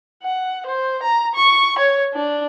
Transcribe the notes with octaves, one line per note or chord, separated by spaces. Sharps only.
F#5
C5
A#5
C#6
C#5
D4